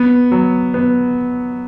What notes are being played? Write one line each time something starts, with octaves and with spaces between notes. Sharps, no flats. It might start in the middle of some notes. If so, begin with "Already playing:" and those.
Already playing: B3
F#3
B3